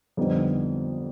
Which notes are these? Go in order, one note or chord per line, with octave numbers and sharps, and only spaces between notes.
F2 D3 G3 B3 D#4